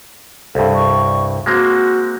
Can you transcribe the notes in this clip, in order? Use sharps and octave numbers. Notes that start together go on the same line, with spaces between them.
C2 G2 A4
C#6
G#3 A#3 C4 F#4